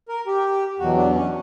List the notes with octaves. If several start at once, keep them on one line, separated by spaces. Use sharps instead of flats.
A#4
G4
E2 B2 F#3 F#4
D4
C#4